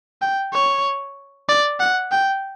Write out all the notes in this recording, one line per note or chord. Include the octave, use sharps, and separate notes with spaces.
G5
C#5
D5
F#5
G5